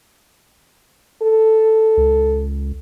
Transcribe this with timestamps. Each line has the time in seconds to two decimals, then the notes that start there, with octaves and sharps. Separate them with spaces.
1.22 A4
1.97 C#2